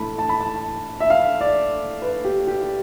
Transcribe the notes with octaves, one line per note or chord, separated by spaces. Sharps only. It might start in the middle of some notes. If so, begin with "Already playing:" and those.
Already playing: A2 E3 A3 A5 B5
A5
B5
A5
E5
F5
D5
B4
G4
G4